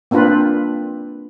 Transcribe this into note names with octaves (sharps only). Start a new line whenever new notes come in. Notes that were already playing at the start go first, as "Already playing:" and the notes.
A#3 C4 D4 F4 B4